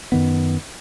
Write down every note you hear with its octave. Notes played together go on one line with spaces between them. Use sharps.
F#2 D#3 B3